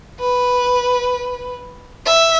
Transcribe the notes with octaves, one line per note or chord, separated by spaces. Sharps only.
B4
E5